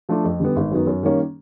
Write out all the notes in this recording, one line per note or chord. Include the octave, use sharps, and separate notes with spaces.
F3 A3 D4 F4
F2
D3 G3 B3
G#1
F#2 D#3 F#3 B3
F#2
D#3 G3 A#3 C#4